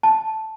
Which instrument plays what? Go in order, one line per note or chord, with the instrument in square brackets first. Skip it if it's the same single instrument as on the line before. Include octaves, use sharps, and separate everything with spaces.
[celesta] A5